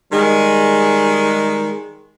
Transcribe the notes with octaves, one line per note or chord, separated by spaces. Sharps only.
D#3 G3 G#3